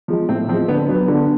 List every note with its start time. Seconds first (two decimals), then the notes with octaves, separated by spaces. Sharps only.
0.08 F3 G#3
0.29 A2 C4
0.48 F3 C4
0.53 G#3
0.68 D3 B3
0.88 F#3 B3
1.08 D3